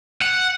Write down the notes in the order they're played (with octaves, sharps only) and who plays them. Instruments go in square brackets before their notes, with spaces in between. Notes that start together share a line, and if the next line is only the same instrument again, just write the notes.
[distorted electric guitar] F#5